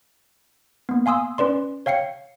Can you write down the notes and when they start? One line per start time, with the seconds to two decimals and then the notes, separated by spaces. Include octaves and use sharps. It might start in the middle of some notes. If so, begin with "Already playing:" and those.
0.89 A#3 B3
1.06 F5 G#5 C6 D#6 E6
1.38 C#4 B4 D5 C6
1.86 C#5 F5 G5 C7 C#7